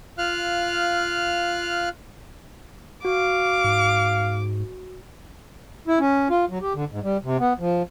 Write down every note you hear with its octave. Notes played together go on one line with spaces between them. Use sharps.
F4 F5 F6 F#6
F#4 F5 D6
G#2
E4
C#4
F4
F#3
G4
D3
G#2
G3
C3
B3
F3